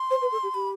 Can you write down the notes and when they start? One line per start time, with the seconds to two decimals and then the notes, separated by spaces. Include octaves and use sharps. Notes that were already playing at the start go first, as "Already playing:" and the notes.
Already playing: C6
0.10 C5
0.21 B4
0.32 A4
0.43 G4
0.54 G4 B5